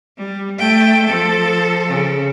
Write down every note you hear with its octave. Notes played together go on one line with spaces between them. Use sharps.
G3
A3 G5
F3 A4
C#3